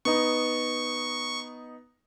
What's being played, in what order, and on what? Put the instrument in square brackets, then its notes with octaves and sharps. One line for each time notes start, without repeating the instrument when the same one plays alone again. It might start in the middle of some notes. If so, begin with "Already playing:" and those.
[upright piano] B3 D#4 [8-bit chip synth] C#6